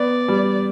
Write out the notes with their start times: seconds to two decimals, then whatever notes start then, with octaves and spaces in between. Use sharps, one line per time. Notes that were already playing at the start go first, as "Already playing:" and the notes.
Already playing: B3 D5
0.28 G3